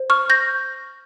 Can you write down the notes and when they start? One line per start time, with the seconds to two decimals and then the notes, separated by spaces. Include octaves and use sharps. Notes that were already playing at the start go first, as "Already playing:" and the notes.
Already playing: C5
0.10 C#6 F6
0.30 G6 A#6